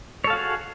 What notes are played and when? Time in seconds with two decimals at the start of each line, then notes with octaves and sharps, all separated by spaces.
0.24 C#5
0.27 A4
0.30 F5
0.33 F#4
0.36 G#4